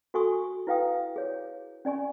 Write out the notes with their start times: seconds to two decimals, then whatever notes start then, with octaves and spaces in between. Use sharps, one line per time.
0.14 F#4 A4 G#5 C#6 D#6
0.67 E4 B4 F5 G5 D#6
1.16 G#4 C#5
1.85 C#4 D5 G#5 C#6